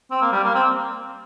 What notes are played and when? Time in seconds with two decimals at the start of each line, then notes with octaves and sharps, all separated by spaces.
0.11 C4
0.22 A#3
0.32 G3
0.44 A#3
0.55 C4